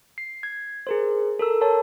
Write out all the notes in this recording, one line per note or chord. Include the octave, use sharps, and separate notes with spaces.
C7
G#6
G#4 A#4 C5
A4 A#4 E6
A#4 C#5 A5